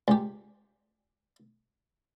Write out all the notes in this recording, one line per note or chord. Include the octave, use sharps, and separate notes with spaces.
C#2 G4